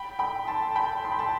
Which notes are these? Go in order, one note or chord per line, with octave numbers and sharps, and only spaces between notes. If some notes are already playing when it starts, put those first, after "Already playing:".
Already playing: G5 B5
G5 B5
A5 C6
G5 B5
C6
B5
A5